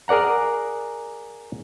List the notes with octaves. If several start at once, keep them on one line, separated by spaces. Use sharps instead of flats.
G#4 A#4 D5 F#5 A#5